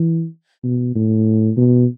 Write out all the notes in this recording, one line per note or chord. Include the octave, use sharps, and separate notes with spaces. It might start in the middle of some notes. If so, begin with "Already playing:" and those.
Already playing: E3
B2
A2
B2